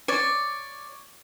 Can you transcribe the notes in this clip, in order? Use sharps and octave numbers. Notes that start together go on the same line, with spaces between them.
C#5 D5